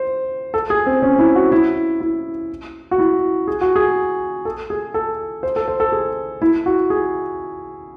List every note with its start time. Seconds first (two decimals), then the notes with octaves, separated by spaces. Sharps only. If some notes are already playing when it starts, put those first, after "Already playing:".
Already playing: C5
0.54 A4
0.70 G#4
0.86 C4
1.02 C#4
1.19 E4
1.35 F#4
1.52 E4
2.01 E4
2.91 F#4
2.99 E4
3.47 G#4
3.61 F#4
3.76 G#4
4.45 A4
4.70 G#4
4.94 A4
5.43 C5
5.56 A4
5.68 C5
5.80 A4
5.92 G#4
6.42 E4
6.66 F#4
6.90 G#4